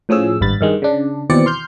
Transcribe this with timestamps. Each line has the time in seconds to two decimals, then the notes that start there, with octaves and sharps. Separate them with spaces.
0.09 A2 F3 C#4 G#4 E6
0.41 G#1 G2 B5 A6
0.61 G2 D#3 G#3
0.82 C#3 D4
1.30 D#2 B2 E3 C4 D5 C#7
1.46 C6 F6 G6